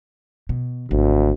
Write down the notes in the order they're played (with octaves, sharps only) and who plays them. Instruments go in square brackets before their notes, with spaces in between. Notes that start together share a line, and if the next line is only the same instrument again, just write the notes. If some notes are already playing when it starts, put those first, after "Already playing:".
[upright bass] B2
[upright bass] G#1 [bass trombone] D2